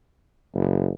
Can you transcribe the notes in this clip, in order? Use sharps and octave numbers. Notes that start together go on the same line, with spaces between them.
F#1